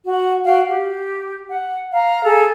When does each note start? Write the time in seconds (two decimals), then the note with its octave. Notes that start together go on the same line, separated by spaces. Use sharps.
0.04 F#4
0.44 F#4 F5 G5
0.68 G4
1.48 F#5
1.92 F5 A#5
2.24 G#4 A4